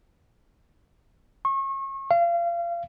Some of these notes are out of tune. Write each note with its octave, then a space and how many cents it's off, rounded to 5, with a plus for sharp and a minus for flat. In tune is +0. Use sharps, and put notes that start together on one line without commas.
C#6 -35
F5 -30